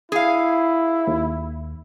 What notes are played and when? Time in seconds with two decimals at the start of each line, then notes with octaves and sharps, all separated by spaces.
0.12 E4 G#4 F5
1.07 D#2